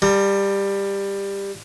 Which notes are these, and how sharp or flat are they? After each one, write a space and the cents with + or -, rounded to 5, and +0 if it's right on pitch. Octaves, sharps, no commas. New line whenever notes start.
G3 +15 A#4 -40